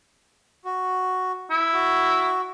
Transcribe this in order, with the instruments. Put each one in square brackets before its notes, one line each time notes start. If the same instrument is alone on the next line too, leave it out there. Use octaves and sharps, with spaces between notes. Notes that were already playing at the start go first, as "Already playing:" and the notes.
[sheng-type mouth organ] F#4
[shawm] E4
[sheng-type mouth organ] F#4